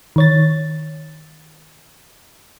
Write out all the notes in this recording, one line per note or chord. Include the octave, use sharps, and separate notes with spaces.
D#3 C#5 A6